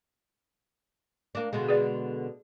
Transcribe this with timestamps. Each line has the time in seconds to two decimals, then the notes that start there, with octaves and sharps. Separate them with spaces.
1.35 A#3 D4
1.53 B2 D3 G#3
1.69 G#4 B4 D5